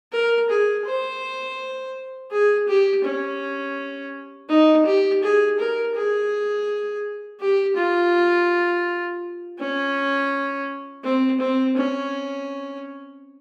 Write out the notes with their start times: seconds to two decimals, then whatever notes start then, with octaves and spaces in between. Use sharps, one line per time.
0.13 A#4
0.50 G#4
0.86 C5
2.31 G#4
2.68 G4
3.04 C#4
4.49 D#4
4.86 G4
5.23 G#4
5.59 A#4
5.95 G#4
7.40 G4
7.76 F4
9.59 C#4
11.04 C4
11.40 C4
11.76 C#4